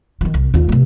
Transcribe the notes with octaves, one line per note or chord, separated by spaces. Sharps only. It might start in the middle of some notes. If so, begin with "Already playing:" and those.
D#3 E3
C2
D#2 F4
C3 A3